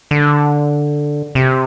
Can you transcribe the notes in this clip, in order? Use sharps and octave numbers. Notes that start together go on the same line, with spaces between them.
D3
C3